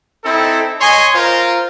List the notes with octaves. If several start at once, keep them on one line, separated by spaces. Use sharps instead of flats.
C4 D#4 E4 A4
C#5 D#5 G#5 C6
F4 A#4 C5